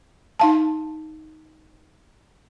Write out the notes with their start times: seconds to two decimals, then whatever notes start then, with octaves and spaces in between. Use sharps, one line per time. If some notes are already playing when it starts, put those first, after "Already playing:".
0.40 D#4 F5 A5